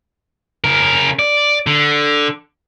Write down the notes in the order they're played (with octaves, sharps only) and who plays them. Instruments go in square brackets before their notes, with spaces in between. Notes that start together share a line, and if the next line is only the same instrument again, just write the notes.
[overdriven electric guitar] C#3 A#4
D5
D3